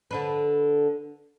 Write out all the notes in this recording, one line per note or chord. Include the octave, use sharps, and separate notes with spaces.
D3 D4 B4